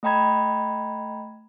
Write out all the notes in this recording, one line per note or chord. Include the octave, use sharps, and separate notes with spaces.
A3 D#5 G5 A#5 B5 G#6